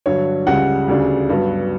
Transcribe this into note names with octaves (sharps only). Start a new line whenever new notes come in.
G2 D3 F#3 C#5
C#2 C#3 G3 F#5
D2 C#3 G3 D4
G2 F#3 B3